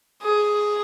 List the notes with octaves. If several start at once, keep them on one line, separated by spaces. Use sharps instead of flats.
G#4